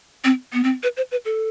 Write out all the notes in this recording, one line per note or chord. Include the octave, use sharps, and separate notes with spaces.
C4
B3
C4
B4
C5
B4
A4